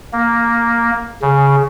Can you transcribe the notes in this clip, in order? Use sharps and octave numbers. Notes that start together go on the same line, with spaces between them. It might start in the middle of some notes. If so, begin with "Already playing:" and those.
A#3
C#3